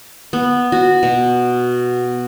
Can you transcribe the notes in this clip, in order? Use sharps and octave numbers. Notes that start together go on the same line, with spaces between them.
B3
F#4
B2